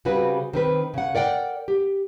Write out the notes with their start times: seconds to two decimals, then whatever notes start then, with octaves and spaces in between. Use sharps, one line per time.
0.05 C#3 G3 C4 F#4 B4
0.53 D#3 C4 B4
0.94 C#3 F#5
1.15 A#4 D5 F#5 G5
1.68 G4